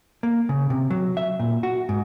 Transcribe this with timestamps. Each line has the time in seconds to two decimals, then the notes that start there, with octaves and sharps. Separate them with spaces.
0.23 A#3
0.49 C#3
0.70 C3
0.90 F#3
1.17 E5
1.40 A#2
1.63 F#4
1.89 G#2